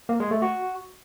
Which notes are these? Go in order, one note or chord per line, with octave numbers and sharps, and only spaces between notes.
A#3
G#3
A3
F#4